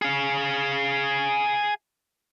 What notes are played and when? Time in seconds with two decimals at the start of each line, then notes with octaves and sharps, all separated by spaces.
0.02 G#4 F5